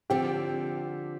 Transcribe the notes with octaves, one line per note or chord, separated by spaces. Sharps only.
D3 F3 C4 G4